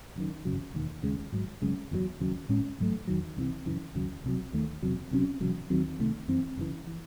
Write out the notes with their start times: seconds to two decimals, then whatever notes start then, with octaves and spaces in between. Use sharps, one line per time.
0.16 F#1 F#2 D#3
0.45 G#1 F#2 C#3 F#3
0.74 E1 D#2 D#3
1.03 D#2 C#3 G#3
1.32 G#1 G#2 F#3
1.62 F#1 F#2 C#3 G#3
1.91 F#1 E2 C#3 F#3
2.20 D#2 C#3 F#3
2.49 A1 A2 G#3 C#4
2.78 A1 G#2 F#3 A3
3.07 E2 D#3 F#3
3.37 C2 C3 E3
3.66 F#2 C#3 E3
3.94 E1 D#2 C#3 F#3
4.24 C2 C3 F#3
4.53 D#2 D#3 A3
4.82 E1 E2 C3 F#3
5.11 C2 C3 F#3 C#4
5.40 E1 E2 C#3 F#3
5.70 D#2 D#3 F#3 C4
5.99 C2 C3 D#3 A3
6.28 F#2 E3 C4
6.57 F#1 F#2 C#3 E3
6.87 E3